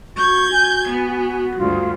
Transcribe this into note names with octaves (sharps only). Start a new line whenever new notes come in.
F#4 C#6 G6 G#6
F#4 G#5
B3
D2 G2 F4